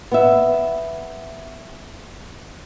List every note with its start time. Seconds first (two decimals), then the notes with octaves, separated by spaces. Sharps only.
0.12 B3 E5